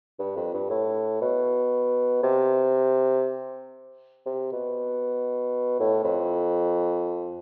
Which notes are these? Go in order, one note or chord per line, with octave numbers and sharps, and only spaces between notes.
G2
F2
G2
A2
B2
C3
C3
B2
A2
F2